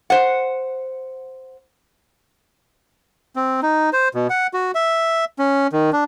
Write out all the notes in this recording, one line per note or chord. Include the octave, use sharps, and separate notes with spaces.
C5 F#5
C4
D#4
C5
B2
F#5
F#4
E5
C#4
D#3
D4